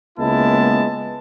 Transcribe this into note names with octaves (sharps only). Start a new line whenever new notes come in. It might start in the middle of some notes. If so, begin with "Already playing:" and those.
C#2 G#3 A#3 B3 E4 A5